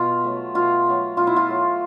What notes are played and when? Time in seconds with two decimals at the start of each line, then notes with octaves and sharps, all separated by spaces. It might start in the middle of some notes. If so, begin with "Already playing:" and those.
Already playing: B2 F4
0.24 F#3 A3
0.55 B2 F4
0.86 F#3 A3
1.17 B2 F4
1.27 E4
1.36 F4
1.49 F#3 A3